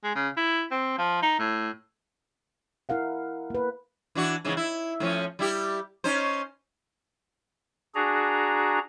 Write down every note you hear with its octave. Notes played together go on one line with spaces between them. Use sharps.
G#3
C#3
E4
C4
F3
D#4
A2
E4 A#4 F5 F#5
A#3 B4
E3 D4 F#4
G#2 C#3 E3
E4
A2 F3 C#4
G3 E4 G4
C#4 D#4 C5
D4 F#4 G#4 A#5